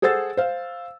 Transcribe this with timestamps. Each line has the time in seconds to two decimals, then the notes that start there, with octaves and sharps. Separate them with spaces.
0.02 G#4 A4 C5 F#5 E6 A6
0.37 C5 F5